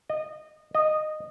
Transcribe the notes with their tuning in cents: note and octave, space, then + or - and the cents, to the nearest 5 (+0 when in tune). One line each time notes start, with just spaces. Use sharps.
D#5 -25
D#5 -15